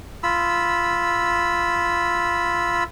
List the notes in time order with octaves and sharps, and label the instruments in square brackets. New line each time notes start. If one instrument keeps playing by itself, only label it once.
[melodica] F4 B5 E6